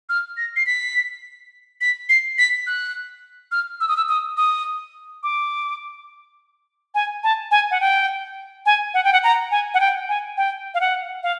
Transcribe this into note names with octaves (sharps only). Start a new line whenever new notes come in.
F6
A#6
C7
B6
B6
C7
B6
F#6
F6
E6
D#6
E6
D#6
D#6
D6
G#5
A5
G#5
F#5
G5
G#5
F#5
G5
F#5
A#5
G#5
F#5
G5
G#5
G5
F5
F#5
F5